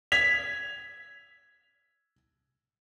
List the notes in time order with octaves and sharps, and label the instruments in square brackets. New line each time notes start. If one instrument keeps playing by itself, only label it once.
[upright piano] G#6 B6 F7